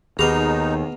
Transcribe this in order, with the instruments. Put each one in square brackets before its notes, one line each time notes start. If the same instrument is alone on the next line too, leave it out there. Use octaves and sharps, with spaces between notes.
[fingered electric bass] D#2 [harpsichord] B2 F5 A#5 [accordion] D#4 [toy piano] G4 G#4 B5